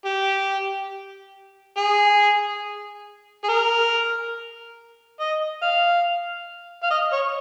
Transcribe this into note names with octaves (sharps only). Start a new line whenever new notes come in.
G4
G#4
G#4
A#4
D#5
F5
F5
D#5
C#5